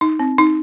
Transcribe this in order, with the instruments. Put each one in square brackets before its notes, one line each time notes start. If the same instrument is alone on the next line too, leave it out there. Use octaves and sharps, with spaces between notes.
[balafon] D#4
C4
D#4